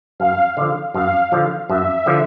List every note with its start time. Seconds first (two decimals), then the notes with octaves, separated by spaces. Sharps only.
0.20 F#2 F5
0.57 D3 F3
0.94 F#2 F5
1.32 D3 F3
1.69 F#2 E5
2.06 D3 F3